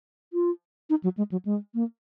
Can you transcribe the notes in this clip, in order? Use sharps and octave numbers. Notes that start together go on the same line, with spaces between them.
F4
D#4
F#3
G#3
F#3
G#3
A#3